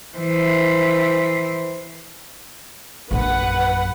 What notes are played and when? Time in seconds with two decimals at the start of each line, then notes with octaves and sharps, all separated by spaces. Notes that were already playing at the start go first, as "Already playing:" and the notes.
0.18 E3 C5
3.11 A#1 F#2 B4 F#5